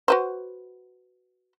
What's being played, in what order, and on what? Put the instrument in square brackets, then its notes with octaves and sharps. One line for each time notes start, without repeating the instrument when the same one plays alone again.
[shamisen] F#4 B4 C5